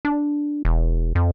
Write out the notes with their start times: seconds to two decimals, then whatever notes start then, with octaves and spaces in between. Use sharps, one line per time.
0.05 D4
0.65 E1
1.15 F2